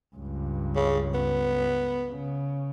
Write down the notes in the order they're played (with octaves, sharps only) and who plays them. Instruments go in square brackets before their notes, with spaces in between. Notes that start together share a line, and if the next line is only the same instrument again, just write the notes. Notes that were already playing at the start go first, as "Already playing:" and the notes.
[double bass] C#2 G2
[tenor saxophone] C#3
B3
[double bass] C#3